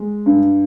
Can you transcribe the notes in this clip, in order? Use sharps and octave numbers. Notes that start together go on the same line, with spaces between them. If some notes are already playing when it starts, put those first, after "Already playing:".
Already playing: G#3
G2